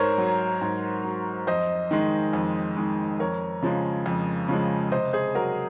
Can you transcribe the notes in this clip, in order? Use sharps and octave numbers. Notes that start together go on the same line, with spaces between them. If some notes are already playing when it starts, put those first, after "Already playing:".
Already playing: G#2 A#4 C5 C#5
F#3
G#2
F#3
F2 C5 D#5
D#3 G#3
F2
D#3 G#3
F2 A#4 C#5
C#3 F3 G#3
F2
C#3 F3 G#3
C3 C5 D#5
G#4 C5
F#3 F#4 A#4